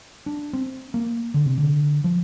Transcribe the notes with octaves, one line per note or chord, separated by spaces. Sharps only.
D4
C4
A#3
D3
C3
D3
F3